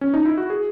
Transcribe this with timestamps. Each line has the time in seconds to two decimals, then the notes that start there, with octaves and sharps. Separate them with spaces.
0.01 C#4
0.14 D#4
0.25 E4
0.37 F#4
0.50 G#4